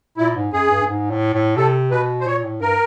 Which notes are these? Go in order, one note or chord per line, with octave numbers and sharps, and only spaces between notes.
A#2 E4
G#2
F#2 G#4
G2
G2
G#2
A2
A2
C3 A4
B2 B4
C5
A#2 C#5
A2
G2 A#4